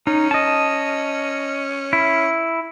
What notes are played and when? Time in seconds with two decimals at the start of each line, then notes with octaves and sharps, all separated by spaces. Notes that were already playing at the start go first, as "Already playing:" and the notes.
0.07 C#4 D#4
0.31 D#5 A5
1.93 E4